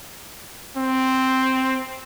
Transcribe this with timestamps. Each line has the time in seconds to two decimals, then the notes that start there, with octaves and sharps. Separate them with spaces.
0.77 C4